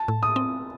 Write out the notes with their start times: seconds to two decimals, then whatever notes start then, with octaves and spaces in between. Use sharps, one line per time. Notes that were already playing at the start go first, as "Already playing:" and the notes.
Already playing: A5
0.08 A2
0.23 D#6
0.36 C4